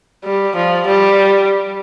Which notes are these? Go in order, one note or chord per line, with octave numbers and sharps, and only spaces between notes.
G3
F3
G3